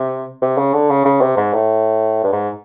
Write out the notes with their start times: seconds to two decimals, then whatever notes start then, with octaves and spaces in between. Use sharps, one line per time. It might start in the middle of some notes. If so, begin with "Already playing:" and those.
Already playing: C3
0.42 C3
0.58 C#3
0.73 D3
0.90 C#3
1.05 C#3
1.21 C3
1.37 G#2
1.53 A2
2.24 G2
2.32 G#2